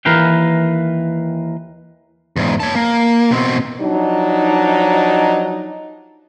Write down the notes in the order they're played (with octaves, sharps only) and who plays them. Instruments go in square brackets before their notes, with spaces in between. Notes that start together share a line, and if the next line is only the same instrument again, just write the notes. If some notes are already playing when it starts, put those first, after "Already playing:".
[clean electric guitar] D#2 E3 A#4 B4 F5 G5
[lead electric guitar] E2 G#2
C#5 A5
A#3
B2 C4
[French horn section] F3 F#3 D4 D#4